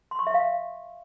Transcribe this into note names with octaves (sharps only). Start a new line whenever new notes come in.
C6
C#6
E5
F5